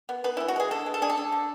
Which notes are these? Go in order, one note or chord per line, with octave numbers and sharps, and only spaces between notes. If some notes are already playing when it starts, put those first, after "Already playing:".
B3
B3 B4
E3 E4
F#4
G#3 G#4
D3 A4
G#3
A4
D4 G#4
A4
D4
D3